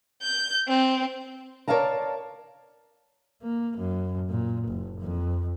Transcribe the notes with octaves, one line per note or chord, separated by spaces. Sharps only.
G6
C4
A#4 C#5 D5 F5 A5 A#5
A#3
F#2
A#2
F#1
F2